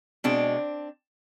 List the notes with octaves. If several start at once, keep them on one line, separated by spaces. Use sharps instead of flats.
B2 G#3 C4 D4